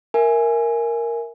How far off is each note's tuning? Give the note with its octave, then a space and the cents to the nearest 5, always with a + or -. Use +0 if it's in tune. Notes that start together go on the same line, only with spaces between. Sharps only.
A#4 +0 E5 +0 G#5 +0